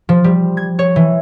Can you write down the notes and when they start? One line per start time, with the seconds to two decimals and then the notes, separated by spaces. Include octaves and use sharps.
0.09 F3
0.24 G3
0.57 G#6
0.79 C#5
0.96 E3